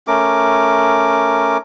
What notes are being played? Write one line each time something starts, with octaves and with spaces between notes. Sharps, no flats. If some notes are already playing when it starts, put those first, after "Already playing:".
A3 C#4 A#4 D6